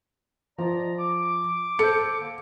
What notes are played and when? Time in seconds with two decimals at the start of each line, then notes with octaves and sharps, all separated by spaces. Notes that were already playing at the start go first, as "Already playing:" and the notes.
0.58 F3 D5 D#5 A#5
0.99 D6
1.79 A4 C5 C#7
2.20 D3 A#3